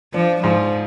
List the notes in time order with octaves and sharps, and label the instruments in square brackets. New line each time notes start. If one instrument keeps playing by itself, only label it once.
[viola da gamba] F3 [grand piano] D4
[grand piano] G#2 [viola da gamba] F3